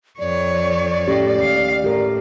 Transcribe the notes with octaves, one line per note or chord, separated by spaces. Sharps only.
F2 C#5 D5
A2 A3 C#4 G4
D#2 F5
A2 G4 A#4